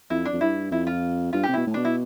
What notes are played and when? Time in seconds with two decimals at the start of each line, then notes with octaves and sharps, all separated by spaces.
0.10 F2 E4
0.25 D4
0.33 F2
0.41 G2 E4
0.71 F2 E4
0.87 F4
1.33 G2 F4
1.43 G4
1.48 C3
1.53 B2 E4
1.67 A2
1.74 B2 D4
1.85 E4